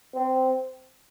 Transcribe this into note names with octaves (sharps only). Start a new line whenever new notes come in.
C4